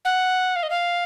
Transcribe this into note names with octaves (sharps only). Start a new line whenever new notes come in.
F#5
F5
D#5
F5